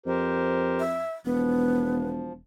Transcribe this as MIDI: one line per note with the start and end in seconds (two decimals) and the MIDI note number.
0.06 1.02 41
0.06 0.82 67
0.06 0.82 70
0.06 0.82 72
0.80 1.13 76
1.25 2.41 28
1.25 2.33 53
1.25 2.07 59